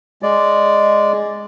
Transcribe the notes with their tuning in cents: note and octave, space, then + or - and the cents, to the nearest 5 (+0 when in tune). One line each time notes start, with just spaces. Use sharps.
G#3 +0 D5 +0